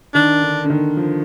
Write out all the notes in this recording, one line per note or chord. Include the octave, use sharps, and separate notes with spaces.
D#3 D4
D3
D3
D#3
F3